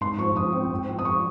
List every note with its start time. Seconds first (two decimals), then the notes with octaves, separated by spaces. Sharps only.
0.01 G#2 C6
0.18 F3 C#6
0.36 G#2 D#6
0.53 C4
0.71 G#2
0.89 F3
0.99 D#6
1.05 G#2 C#6